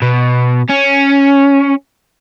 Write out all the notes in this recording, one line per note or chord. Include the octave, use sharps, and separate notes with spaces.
B2
C#4